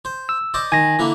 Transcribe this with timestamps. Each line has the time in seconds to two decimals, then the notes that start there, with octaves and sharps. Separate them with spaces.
0.05 C5
0.29 E6
0.54 C5 D5 D#5
0.72 D#3 G#5 A#6
0.99 D3 E3 A#3